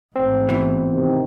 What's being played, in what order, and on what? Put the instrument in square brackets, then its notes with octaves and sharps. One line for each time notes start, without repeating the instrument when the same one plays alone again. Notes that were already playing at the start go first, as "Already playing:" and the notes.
[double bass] A1 G#2 [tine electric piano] C4
[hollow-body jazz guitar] B2 E3
[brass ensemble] C3 D#3